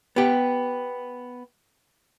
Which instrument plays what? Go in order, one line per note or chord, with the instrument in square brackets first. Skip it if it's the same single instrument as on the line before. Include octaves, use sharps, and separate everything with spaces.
[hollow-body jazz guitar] B3 G4